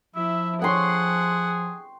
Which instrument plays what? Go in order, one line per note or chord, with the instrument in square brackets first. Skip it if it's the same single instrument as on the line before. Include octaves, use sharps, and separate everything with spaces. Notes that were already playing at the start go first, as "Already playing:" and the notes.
[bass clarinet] F3 [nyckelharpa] E4 [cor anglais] E5
[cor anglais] G#4 [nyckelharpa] F#5 [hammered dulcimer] G5 C6 C#6